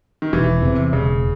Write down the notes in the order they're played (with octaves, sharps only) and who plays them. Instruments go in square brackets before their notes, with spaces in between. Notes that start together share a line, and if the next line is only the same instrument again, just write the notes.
[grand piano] D#3
[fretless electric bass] E1 [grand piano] E3
[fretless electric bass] E2 C3
[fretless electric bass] E1 [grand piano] C#3